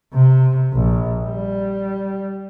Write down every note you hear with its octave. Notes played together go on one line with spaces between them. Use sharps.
C3
A#1
G3